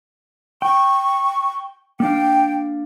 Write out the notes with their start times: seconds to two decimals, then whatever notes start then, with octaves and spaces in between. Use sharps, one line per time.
0.62 G5 C#6
2.00 A#3 D4 F5 G5